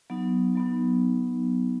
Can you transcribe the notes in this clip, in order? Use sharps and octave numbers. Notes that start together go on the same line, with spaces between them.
F#3 B3 D#4
F#3 B3 D#4